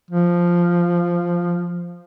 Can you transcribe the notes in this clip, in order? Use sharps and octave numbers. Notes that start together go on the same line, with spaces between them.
F3